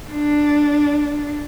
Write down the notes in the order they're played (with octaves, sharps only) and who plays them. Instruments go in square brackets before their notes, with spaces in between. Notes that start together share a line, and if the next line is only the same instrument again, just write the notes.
[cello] D4